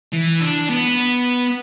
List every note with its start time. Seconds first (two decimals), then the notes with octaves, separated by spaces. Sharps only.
0.13 E3
0.41 D4
0.70 B3